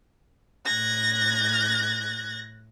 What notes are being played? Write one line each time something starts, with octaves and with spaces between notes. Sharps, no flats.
A2 F#6 G#6 A#6